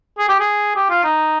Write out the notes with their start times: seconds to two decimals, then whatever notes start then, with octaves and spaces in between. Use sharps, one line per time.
0.18 G#4
0.29 G4
0.40 G#4
0.75 G4
0.89 F4
1.04 D#4